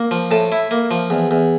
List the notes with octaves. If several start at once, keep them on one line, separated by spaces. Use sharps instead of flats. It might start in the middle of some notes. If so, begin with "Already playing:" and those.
Already playing: A#3
F3
A2 A5
E4
A#3
F3
E2
E2